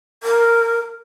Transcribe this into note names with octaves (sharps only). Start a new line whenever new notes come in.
A#4